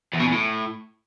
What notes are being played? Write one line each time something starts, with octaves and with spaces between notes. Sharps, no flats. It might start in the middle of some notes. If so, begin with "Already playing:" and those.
E2
B2
E2
A2